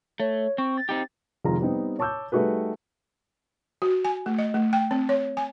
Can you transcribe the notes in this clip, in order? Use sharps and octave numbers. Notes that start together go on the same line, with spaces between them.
A3 C#5
C4 C#6
A6
C4 D#4 G4
F1 D#3 G#3 F4 A#5
G3 B3 C4 D#4
C#5 A5 C#6 D6 E6 G6
G3 A3 D#4 F#4 G#4 B4
F#4
G#5
A3
D#5
A3
G5
C4
C#5
G#5